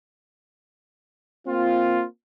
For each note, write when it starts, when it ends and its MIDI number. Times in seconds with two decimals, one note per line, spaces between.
1.46 2.04 58
1.46 2.04 60
1.46 2.04 65